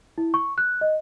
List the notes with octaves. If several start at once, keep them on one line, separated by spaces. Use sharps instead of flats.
E4
C#6
F#6
D#5